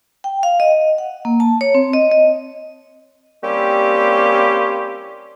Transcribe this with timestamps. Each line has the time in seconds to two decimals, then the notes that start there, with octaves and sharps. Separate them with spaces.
0.24 G5
0.43 F5
0.60 D#5
0.98 F#5
1.25 A#3
1.40 A5
1.61 C#5
1.74 C4
1.93 D#5
2.11 D#5
3.44 G3 A#3 C4 C#4 E4 G4